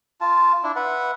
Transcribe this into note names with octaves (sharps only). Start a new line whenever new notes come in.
F4 A5
D4 E4
B4 E5 F#5